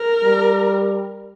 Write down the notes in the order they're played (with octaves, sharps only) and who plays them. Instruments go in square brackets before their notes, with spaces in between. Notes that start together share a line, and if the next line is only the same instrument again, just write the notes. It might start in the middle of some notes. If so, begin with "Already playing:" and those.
Already playing: [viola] A#4
[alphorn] G3